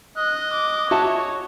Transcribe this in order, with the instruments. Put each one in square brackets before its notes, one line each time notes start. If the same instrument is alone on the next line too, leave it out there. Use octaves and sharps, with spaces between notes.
[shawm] D#5 [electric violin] F#6
[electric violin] D6
[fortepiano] F#4 E5 A5 [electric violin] C#5